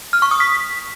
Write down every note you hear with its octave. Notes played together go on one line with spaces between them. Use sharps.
F6
C#6
D#6
B6